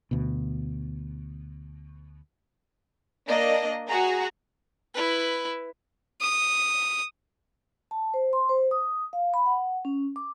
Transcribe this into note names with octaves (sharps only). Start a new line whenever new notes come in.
D2 B2
A#3 D4 D#5
F#4 G#4 F#5 A#5
E4 B4
D#6
A5
C5
C6
C5
D#6
F5
B5
F#5
C#4
D6